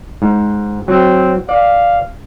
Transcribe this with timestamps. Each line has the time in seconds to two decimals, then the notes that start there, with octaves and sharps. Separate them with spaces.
0.22 G#2
0.88 F#3 C4
1.49 D5 F5